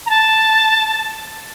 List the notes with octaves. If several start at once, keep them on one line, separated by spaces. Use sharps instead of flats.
A#5
A5